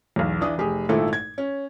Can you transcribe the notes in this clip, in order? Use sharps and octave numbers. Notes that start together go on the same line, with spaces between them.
B1 E2
E3 D4 D#6
F1 G4 G#4
G#1 A#2 A3 E4 A4
G#6
C#4